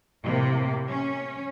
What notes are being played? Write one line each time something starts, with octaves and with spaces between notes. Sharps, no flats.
A2 C3 A#3
C#4